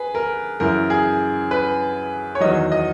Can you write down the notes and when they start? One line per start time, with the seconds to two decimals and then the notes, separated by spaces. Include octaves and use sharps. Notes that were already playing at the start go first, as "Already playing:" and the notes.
Already playing: G#4 B4
0.15 A#4
0.60 F#2 C#3 E3 A#4
0.90 G#4
1.51 B4
2.35 C#5
2.40 E2 D#3 F#3 D#5
2.72 D#5